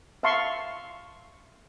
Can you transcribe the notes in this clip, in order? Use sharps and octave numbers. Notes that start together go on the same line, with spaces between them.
E5 F5 A5 C6 C#6